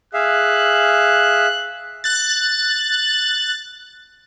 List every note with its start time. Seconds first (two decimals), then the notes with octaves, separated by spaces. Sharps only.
0.14 G#4 E5 F5 F#6
2.04 F#6 A6